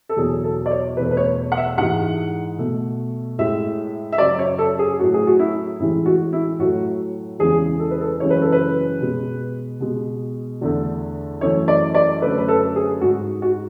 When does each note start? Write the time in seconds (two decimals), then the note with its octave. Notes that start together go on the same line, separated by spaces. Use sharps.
0.09 A4
0.17 E2 B2 F#3 G#4
0.44 A4
0.66 D5
0.71 C#5
0.97 E2 B2 A3 B4
1.11 B4
1.17 C#5
1.52 F#5
1.57 E5
1.78 G#2 E3 G#3 F#5
2.58 B2 A3
3.38 A2 G#3 E5
4.12 E5
4.18 F#2 C#3 F#3 D5
4.39 C#5
4.59 A4
4.79 G#4
4.99 A2 F#3 A3 F#4
5.14 G#4
5.27 F#4
5.39 E4
5.79 A2 E3 G#3 E4
6.06 F#4
6.33 E4
6.59 A2 F#3 A3 F#4
7.39 E2 C#3 E3 G#3 G#4
7.79 A4
7.91 B4
8.01 A4
8.20 F#2 C#3 E3 G#3 C#5
8.30 B4
8.42 A4
8.52 B4
9.00 B2 G#3
9.80 B2 G#3
10.61 E2 D3 A3
11.41 F#2 E3 A3 C#5
11.68 D5
11.94 D5
12.22 F#2 D3 A3 B4
12.38 B4
12.48 A4
12.76 G#4
13.01 G#2 G#3 F#4
13.42 F#4